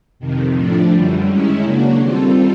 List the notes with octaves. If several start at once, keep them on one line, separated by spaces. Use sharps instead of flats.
F2 C3 D#3
A2 F3 A3 D4
F#2 D3 G3
D#3 G#3 C#4 E4
C#3 F#3 A#3 D4 F#4
D#3 G3 C4 F4 A4